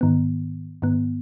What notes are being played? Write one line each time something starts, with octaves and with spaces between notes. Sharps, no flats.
G#2 D#3 B3
G#2 D#3 B3